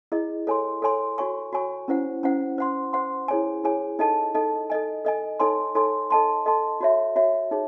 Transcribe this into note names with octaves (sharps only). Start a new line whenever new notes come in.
E4 G#4 D#5
A4 C#5 G#5 C6
A4 C#5 G#5 C6
F#4 C#5 G#5 C#6
F#4 C#5 G#5 C#6
C#4 E4 C5 F#5
C#4 E4 C5 F#5
C5 F#5 C6
C5 F#5 C6
E4 G#4 C#5 G#5
E4 G#4 C#5 G#5
D#4 A4 D#5 A5
D#4 A4 D#5 A5
A4 D#5 G#5
A4 D#5 G#5
D#4 A4 C#5 G#5 C6
D#4 A4 C#5 G#5 C6
A4 D#5 A5 C6
A4 D#5 A5 C6
F#4 C#5 E5
F#4 C#5 E5
D#4 G#4 C#5